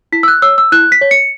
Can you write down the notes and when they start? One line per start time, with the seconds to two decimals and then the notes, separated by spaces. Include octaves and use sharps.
0.12 E4 B6
0.23 E6
0.28 F#6
0.42 C#5 E6
0.58 E6
0.72 E4 F#6
0.92 B6
1.01 C#5
1.11 C#7